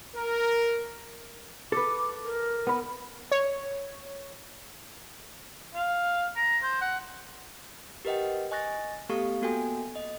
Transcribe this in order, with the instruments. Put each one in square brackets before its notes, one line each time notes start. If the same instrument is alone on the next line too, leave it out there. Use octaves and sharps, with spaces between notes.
[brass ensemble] A#4
[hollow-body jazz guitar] A4 B4 [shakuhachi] D6
[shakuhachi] A#4
[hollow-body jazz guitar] B3 B5
[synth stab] C#5
[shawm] F5
A#5
C5
F#5
[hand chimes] G4 A#4 B4 D#5 F#5 G5
D#5 G#5 C#6 F#6 A6 A#6
A3 B3 G4 A4 F5 C#6
A#3 B3 F#4 A4 G5 G#5
D#5